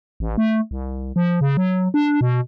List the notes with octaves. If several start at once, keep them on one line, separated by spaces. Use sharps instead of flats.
A1
A3
C2
F3
C#3
F#3
D4
B2